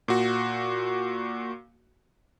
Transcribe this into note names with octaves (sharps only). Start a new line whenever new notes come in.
A#2 F#4